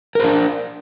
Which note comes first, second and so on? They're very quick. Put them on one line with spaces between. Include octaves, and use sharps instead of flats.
A#4 C5 D4